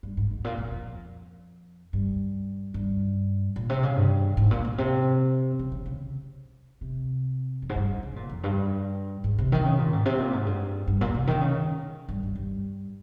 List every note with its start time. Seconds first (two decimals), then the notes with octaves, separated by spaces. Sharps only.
0.03 G2
0.17 G#2
0.31 G#2
0.44 A#2
0.58 A#2
0.71 F2
1.93 G2
2.74 G2
3.56 A#2
3.70 C3
3.83 C#3
3.97 G2
4.37 G#2
4.51 A#2
4.65 A#2
4.78 C3
5.59 C#3
5.72 C#3
5.86 C#3
6.81 C3
7.62 F2
7.69 G#2
7.76 G2
8.03 C#3
8.16 A#2
8.29 F2
8.44 G2
9.24 G#2
9.38 C3
9.52 D#3
9.65 C#3
9.78 A#2
9.93 G#2
10.06 C3
10.19 A#2
10.33 G#2
10.46 G2
10.87 G2
11.01 A#2
11.15 C3
11.27 D#3
11.41 C#3
12.08 G2
12.23 G2
12.36 G2